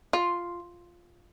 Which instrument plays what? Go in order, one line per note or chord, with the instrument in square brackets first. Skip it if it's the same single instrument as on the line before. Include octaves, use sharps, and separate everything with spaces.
[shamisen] F4